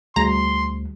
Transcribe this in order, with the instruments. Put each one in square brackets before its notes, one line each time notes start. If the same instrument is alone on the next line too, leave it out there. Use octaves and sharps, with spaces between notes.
[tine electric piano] D2 [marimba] G3 F#4 G#4 [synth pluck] A#5 [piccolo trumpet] C6